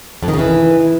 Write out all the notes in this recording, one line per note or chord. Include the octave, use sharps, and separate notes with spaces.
F2
D#3
C#3
E3